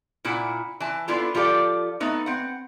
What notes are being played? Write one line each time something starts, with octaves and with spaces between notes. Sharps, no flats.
A#2 E4 F#5
E3 A5
B3 D4 E4 F4 A4
F3 F4 G4 A4 D5
A3 B3 D#4
C4 F#5